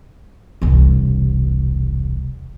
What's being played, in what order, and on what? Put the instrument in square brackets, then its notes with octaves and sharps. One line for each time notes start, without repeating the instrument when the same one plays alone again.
[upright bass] E1 C2